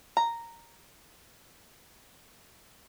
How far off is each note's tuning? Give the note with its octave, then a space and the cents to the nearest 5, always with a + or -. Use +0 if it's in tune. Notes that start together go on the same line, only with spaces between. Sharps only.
A#5 -10